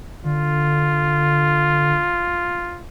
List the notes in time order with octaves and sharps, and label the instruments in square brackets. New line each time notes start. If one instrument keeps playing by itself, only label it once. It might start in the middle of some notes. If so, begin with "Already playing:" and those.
[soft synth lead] D3 [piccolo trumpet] F4